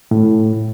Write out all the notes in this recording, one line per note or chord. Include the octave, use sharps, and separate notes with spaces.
A2